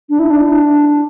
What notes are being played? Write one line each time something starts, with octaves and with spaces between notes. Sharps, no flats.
D4
E4
D4